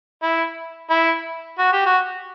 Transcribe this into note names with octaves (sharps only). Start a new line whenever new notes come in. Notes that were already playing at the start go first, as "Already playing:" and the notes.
E4
E4
F#4
G4
F#4